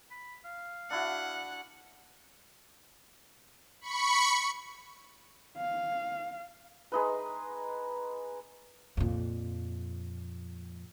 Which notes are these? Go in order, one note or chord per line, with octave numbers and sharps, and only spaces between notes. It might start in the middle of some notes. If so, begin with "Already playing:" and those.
B5
F5
D4 E4 F#4 F#5
B5 C#6 C#7
F5
G#3 D#4 B4
F2 A#2